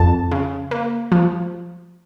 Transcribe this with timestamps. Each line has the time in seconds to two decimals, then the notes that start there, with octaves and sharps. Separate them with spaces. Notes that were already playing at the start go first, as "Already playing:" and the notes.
Already playing: F2 A5
0.32 C#3
0.71 A#3
1.12 F3